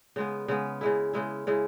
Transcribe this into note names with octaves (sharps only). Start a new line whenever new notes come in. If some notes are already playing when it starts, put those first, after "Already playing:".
C#3 G#3 B3
C#3 G#3 B3
C#3 G#3 E4
C#3 G#3 E4
C#3 G#3 E4